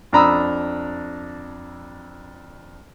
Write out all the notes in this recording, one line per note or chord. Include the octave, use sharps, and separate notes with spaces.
F2 D4 A#5 B5 D#6 E6